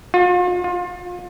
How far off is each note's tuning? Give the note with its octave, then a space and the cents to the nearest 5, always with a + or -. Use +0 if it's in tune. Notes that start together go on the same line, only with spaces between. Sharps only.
F4 +40
F4 +30